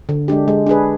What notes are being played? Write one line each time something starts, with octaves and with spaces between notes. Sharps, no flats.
D3
G#3 D4 G4
G#3
D4 G#4 B4